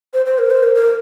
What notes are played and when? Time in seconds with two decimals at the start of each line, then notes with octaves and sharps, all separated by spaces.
0.14 C5
0.26 C5
0.38 A#4
0.51 C5
0.63 A#4
0.75 A#4